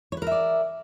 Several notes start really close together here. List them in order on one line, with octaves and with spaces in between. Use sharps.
C#5 B4 A#4 E5 D5